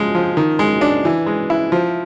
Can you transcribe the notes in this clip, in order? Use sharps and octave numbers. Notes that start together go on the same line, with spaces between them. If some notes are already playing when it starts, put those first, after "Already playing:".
Already playing: F3 G#3
F3
D#3
G#3
D4
E3
G#3
E4
F3